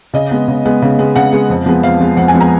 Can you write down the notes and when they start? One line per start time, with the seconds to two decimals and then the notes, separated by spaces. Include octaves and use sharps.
0.14 C#3 D#5
0.31 G#3 B3
0.48 C#3
0.65 G#3 B3
0.82 C#3
0.99 G#3 B3
1.16 C#3 F#5
1.32 G#3 B3
1.50 F2
1.66 F3 G#3 B3
1.83 F2 F5
2.00 F3 G#3 B3
2.17 F2 F#5
2.28 G#5
2.34 F3 G#3 B3
2.41 A#5